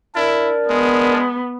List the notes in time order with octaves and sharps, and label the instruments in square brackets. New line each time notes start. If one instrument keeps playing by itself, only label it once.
[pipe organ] D4 A#4 D5 [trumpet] E4
[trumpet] G#3 [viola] B3